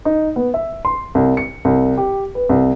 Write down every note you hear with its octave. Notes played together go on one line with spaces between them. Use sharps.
D#4
B3
E5
C6
C2
C#7
C2
G4
B4
C2